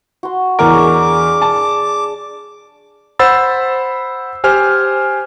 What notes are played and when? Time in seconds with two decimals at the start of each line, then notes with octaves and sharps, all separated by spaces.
0.23 F#4 C6
0.59 E2 G#3 A#4 C#5 D5 D6
0.73 D4 G#4
1.42 A5
3.19 C5 F#5 B5 E6 A6
4.44 G4 C5 G#5 F6